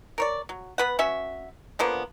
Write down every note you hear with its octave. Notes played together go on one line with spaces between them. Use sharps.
A#4 C#5 D5
F#3
B3 B4 F#5
C#4 F#4 E5
D3 F3 A#3 B3